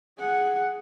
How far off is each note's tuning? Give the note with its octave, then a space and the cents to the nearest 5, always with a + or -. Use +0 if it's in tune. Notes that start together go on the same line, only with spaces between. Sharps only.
G#4 +0 F#5 +0